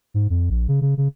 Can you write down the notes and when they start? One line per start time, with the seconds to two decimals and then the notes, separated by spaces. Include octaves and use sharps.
0.14 G#2
0.30 F2
0.50 A#1
0.68 C#3
0.81 C#3
0.97 C#3